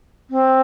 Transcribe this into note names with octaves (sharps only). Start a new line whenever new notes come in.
C4